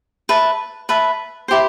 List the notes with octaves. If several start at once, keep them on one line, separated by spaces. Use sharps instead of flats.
B4 E5 A5
B4 E5 A5
E4 G4 C5